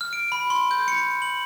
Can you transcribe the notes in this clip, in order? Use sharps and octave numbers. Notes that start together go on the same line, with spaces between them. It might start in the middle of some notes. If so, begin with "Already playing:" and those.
F6
D7
B5
C6
G6
C#7
F#7